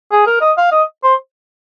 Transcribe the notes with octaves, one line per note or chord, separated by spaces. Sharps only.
G#4
A#4
D#5
F5
D#5
C5